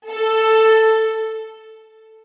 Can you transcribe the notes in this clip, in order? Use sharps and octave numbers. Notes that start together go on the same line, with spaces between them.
A4